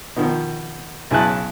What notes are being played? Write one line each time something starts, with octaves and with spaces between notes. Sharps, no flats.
B2 D#3 F3
B1 C#3 E4 G#5 A5 F#6